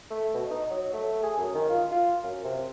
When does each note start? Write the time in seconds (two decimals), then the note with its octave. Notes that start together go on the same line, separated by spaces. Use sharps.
0.10 A3
0.34 B2
0.51 D#4
0.70 F#3
0.94 A3
1.23 G#4
1.38 F#2
1.55 D#3
1.69 F4
1.91 F4
2.24 F#2
2.44 C3